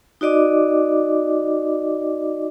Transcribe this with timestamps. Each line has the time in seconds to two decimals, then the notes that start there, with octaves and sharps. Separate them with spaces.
0.21 D#4 F#4 D5 D#5 D6